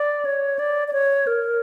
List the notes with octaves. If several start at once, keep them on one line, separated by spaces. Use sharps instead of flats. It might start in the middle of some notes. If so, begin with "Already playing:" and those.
Already playing: D5
C#5
D5
D5
C#5
A#4